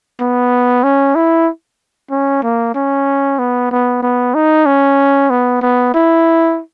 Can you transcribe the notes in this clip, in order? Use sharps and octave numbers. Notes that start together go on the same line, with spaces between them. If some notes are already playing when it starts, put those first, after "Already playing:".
B3
C#4
E4
C#4
A#3
C#4
B3
B3
B3
D#4
C#4
B3
B3
E4